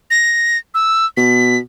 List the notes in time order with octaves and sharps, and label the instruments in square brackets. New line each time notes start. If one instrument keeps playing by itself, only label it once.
[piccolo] A#6
E6
[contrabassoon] B2 [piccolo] B6